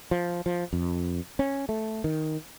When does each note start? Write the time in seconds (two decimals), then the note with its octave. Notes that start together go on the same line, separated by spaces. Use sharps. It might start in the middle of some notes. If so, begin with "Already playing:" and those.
0.11 F3
0.46 F3
0.73 F2
1.39 C#4
1.69 A3
2.04 D#3